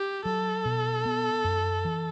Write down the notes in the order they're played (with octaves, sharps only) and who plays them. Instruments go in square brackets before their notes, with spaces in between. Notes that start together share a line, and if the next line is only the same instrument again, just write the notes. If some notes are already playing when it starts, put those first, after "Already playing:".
Already playing: [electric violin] G4
[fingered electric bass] F#3 [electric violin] A4
[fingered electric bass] B2
B3
F#2
E3